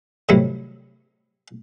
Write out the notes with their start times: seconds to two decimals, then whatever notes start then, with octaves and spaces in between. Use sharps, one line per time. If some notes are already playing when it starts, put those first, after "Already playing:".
0.29 A2 C3 D#3 F#3 G3 E4